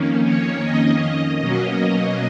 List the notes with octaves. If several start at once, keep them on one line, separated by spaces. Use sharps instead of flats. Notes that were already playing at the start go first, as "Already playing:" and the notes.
Already playing: F2 D#3 A#3 C#4
C#5
D#5
B2 F#3 A#3 C#4